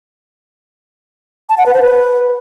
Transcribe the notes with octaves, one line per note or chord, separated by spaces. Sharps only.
A5
F#5
B4
C5
B4